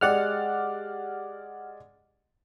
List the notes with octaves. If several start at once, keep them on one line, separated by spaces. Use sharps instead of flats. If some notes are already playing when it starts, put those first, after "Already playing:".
G#3 G4 D5 F#5 F6